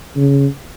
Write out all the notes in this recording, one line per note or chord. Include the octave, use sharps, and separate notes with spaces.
C#3